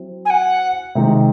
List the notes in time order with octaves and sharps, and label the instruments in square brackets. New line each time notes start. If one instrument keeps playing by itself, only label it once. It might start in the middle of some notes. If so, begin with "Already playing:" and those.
Already playing: [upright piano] F#3 C4 E4
[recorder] G#5
F#5
[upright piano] C3 D#3 G#3 D#4